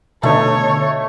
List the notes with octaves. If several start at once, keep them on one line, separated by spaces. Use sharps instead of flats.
B2 D3 A3 D#4 C#5